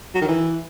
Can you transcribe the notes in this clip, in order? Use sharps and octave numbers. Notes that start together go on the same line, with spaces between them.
F#3
D#3
E3